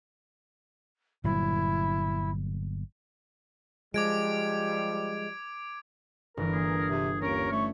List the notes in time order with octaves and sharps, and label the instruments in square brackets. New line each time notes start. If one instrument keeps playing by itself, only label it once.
[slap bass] G1 A#2 F#3 [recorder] E4
[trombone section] F3 G3 [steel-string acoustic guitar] G#3 [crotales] D6 G#6 D7
[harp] G1 E3 [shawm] A#4
[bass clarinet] E3 [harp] A#3 [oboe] G#4
[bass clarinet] C3
[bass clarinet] D#2 [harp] C#4 D7 [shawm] A#4 [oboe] C#5
[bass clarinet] A3 [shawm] C#6